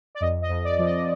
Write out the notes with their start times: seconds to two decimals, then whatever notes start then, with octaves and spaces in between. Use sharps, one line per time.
0.15 D5
0.21 F2 D#5
0.42 D#5
0.49 F2
0.64 D5
0.79 F3
0.86 D#5